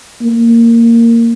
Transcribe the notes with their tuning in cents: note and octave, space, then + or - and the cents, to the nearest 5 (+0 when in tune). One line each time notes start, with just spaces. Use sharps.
A#3 -15